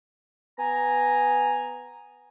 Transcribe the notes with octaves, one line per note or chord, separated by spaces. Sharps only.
B3 G#5 A#5